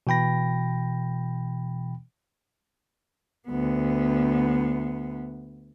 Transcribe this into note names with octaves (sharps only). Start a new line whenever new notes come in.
B2 E3 G5 B5 A#6
D2 B3